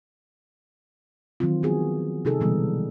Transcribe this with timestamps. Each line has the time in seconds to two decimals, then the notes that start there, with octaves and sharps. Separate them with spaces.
1.40 D#3 E3 F#3 C4 F4
1.63 F3 B3 F#4 G#4
2.25 C3 D#4 G#4 A4
2.41 B2 D3 E3 G3 G#3 B3